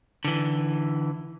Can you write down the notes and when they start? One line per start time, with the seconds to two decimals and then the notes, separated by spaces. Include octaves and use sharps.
0.25 D3 E3